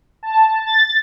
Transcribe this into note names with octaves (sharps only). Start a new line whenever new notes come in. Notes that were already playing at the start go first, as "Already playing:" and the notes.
A5
A6